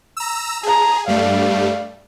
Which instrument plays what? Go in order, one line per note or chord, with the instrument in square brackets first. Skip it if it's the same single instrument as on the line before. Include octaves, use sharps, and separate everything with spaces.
[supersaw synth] A#5 E6
[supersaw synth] G#4 [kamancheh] A5 A#5
[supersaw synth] G2 G3 A3 [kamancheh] D5 F5